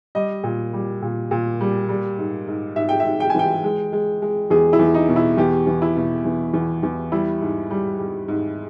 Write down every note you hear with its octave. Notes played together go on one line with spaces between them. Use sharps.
G3 D#5
A#2
G3
A#2
A#2
G3
G3
G#2
G#2
G#2 E5
G5
E5
G#2
G5
G#5
E3 G5
G#3
G#3
G#3
E2 G#4
E4
E2
D#4
B2
E4
E2 G4
E2
E4
B2
E2
E2
E2
G3 E4
G#2
G3
G3
G#2